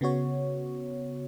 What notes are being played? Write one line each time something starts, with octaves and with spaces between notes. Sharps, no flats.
C#3 B3 F#4 C#5